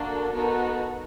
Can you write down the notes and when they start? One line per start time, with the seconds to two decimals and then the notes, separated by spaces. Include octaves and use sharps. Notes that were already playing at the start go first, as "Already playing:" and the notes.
Already playing: A#3 D4 F#4 A4
0.34 B3 D#4 F#4 A4 A#4